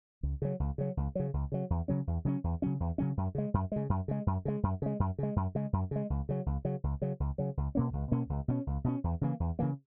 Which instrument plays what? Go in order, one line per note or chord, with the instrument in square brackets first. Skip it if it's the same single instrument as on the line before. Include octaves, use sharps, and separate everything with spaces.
[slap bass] C#2
C#3 F#3
C#2
C#3 F#3
C#2
C#3 F#3
C#2
C#3 F#3
E2
C#3 F#3 C#4
E2
C#3 F#3 C#4
E2
C#3 F#3 C#4
E2
C#3 F#3 C#4
F#2
C#3 G#3
F#2
C#3 G#3
F#2
C#3 G#3
F#2
C#3 G#3
F#2
C#3 G#3
F#2
C#3 G#3
F#2
C#3 G#3
F#2
C#3 G#3
C#2
C#3 F#3
C#2
C#3 F#3
C#2
C#3 F#3
C#2
C#3 F#3
C#2
B2 A#3 C#4
C#2
B2 A#3 C#4
C#2
B2 A#3 C#4
C#2
B2 A#3 C#4
E2
C#3 E3 A#3
E2
C#3 E3 A#3